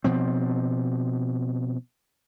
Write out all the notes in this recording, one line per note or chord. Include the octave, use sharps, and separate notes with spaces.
B2 F3 C4